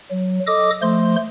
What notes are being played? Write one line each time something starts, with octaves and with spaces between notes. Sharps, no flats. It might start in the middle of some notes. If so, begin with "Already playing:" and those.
F#3
A4 D#5 D6 D#6
F3 A3 C5 C6